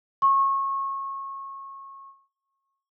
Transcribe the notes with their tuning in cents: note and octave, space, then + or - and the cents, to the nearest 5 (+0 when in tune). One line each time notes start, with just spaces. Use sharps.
C#6 -25